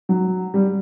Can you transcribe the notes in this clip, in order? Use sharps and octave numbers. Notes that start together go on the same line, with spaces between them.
F#3
G3